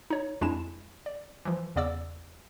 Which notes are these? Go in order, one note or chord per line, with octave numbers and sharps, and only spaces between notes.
D#4 C#5
F2 G#3 D4 E4 G#5 E7
D5
E3 F3
E2 C#3 B3 D5 D6 E6